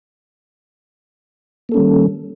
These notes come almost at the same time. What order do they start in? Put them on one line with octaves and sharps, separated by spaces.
A#3 A4 C#4 G3 D#3